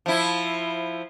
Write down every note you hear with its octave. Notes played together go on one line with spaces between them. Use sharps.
F3 E4